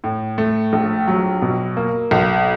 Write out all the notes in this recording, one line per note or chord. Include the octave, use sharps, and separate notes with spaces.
A2
A3
A#1
F#3
B2
A#3
B1